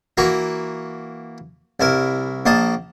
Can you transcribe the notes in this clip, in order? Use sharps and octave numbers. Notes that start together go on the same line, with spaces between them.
E3 A#3 F#4 A#5
C2 E4 A#4
A#1 A#3 D#5 A5